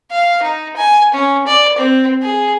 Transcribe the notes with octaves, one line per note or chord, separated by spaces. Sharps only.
F5
D#4
G#5
C#4
D5
C4
G#4